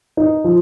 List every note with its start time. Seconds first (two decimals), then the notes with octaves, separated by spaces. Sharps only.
0.17 D#4
0.44 F3